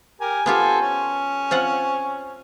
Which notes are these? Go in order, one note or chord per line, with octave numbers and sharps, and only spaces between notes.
G4 A#4 G#5
B3 F4 G4 A4 C5 G#5
C#4
C4 F4 F#5